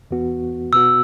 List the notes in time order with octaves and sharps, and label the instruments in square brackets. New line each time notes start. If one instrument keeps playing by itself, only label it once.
[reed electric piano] E2 E3 B3 F#4
[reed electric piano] B2 B3 F#4 [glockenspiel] E6